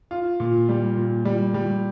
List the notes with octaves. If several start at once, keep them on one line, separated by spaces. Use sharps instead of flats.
F4
A#2
G3
A#2
G3
G3